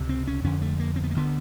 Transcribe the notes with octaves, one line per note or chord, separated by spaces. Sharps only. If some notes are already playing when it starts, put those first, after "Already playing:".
Already playing: C#2 C3
C4
C#4
F2 D3 C#4
A3
A#3
C4
B3
A#3
D2 D3 B3